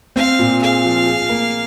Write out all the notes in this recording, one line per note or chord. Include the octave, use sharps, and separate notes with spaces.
C4 F5
A#2
G#4 F5
F3
G#4
A#3